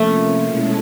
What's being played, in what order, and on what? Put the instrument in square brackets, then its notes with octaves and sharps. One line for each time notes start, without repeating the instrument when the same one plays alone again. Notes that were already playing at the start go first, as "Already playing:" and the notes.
Already playing: [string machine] C3 F3 A#3 C#4 [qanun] A3
[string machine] B2 G#3 C#4 E4 A4